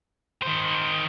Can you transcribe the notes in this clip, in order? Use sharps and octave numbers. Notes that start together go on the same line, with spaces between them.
D#3 C5